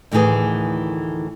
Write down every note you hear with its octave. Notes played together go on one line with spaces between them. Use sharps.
D2 A2 D#3 E3 G#4